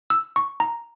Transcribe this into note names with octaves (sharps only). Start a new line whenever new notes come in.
E6
C#6
A#5